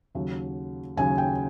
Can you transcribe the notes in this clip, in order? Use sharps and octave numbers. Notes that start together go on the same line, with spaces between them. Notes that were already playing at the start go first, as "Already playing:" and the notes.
D#2 C#3 F#3
D#2 C#3 F#3 G#5
G5